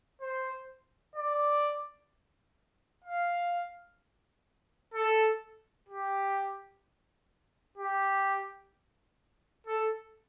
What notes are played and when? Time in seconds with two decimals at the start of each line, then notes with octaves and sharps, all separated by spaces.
0.21 C5
1.16 D5
3.05 F5
4.94 A4
5.89 G4
7.78 G4
9.67 A4